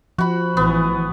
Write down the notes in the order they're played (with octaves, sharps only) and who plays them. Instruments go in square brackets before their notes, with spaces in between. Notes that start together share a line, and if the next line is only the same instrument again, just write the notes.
[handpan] F3 [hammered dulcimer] F#4 B5
[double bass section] A1 E3 [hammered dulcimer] B3